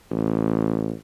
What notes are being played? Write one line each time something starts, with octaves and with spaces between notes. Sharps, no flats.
A1